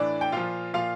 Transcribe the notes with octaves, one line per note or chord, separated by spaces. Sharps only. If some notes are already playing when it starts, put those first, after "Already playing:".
Already playing: A2 E3 D4 D5
G5
A#2 F3 F4 F5
A#2 F3 F4 F5